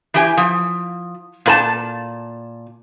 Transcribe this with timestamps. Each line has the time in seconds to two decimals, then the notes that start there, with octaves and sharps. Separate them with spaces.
0.14 E3 G4 G#5
0.37 F3
1.46 A#2 B4 A5